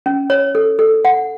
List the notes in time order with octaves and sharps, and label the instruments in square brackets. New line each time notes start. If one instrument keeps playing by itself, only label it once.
[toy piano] C#4
C#5
A4
A4
F#5